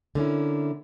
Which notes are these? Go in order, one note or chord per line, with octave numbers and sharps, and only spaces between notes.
D3 A#3 C#4 E4